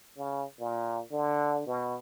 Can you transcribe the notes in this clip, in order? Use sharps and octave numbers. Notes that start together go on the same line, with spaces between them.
C#3
A#2
D3
B2